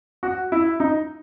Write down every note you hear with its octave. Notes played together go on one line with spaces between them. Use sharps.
F#4
E4
D#4